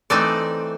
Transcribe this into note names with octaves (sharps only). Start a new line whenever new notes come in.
E3 A3 C4 D#4 D5